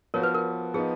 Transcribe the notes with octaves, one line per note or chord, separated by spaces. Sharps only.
F3 B3 F#4 A#4 C#5
B4
A#4
F3 B3 D#4 G#4